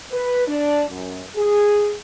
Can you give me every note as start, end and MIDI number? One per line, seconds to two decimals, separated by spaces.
0.11 0.44 71
0.47 0.84 62
0.89 1.21 42
1.35 1.94 68